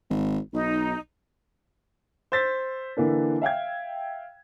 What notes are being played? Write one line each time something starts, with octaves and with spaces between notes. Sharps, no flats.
G#1
B1 D#4
C5 E6 A6 B6
D3 E3 A#3 D4
E5 F5 G5 G#6